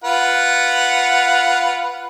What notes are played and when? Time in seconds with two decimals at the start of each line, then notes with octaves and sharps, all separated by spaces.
0.04 F4 B4 F#5